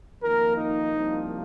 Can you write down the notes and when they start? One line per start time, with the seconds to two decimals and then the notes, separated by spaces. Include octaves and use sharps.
0.22 F2 D#3 A#3 A#4
0.58 D#4
0.95 C2 C3 F3 A#3